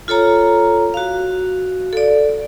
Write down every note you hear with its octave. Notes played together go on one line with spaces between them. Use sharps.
F4 A4 C#5 A#5
F#4 F5
A4 D5